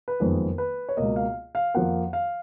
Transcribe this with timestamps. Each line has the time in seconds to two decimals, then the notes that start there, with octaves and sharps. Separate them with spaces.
0.08 B4
0.20 F#1 F2 D#3 G#3 B3 A#4
0.58 B4
0.89 C#5
0.97 C#2 B2 A#3 D#5
1.16 F5
1.55 F5
1.74 F2 F3 A#3 F#5
2.13 F5